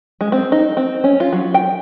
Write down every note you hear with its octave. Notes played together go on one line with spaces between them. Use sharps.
G#3
C4
D#4
C4
C#4
F4
F#3
G5